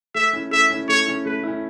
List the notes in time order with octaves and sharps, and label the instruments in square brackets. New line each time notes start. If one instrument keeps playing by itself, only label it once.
[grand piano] A3 [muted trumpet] E5
[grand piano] C#4 E4
[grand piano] A3 [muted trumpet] E5
[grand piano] C#4 E4
[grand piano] A3 [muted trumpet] C#5
[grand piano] C#4 E4
[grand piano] A3 [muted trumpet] B4
[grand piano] C#4 E4